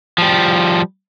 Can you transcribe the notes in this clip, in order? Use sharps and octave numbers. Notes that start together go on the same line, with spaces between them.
F3 G3